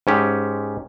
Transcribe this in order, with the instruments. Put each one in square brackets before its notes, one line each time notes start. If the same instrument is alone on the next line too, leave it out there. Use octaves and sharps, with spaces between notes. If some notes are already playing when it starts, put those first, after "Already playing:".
[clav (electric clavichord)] G#2 C#4 G4